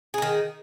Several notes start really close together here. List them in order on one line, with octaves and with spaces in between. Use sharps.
G#4 D#4 D#3